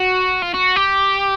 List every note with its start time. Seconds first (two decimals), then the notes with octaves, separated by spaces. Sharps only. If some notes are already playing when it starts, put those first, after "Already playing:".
Already playing: F#4
0.42 F4
0.54 F#4
0.76 G4